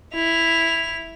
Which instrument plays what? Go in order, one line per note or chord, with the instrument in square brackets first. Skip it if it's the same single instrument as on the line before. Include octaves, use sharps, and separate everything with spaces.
[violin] E4 F7